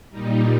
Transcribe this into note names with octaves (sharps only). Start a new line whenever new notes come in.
A#2 G3 D#4